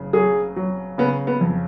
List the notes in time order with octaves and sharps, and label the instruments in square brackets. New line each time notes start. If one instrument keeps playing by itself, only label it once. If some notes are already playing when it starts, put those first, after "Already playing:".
Already playing: [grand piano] F#1 C#3
[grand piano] F#3 [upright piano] G#4
[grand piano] F#3
[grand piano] C#3 [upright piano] B3
[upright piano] B3
[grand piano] F2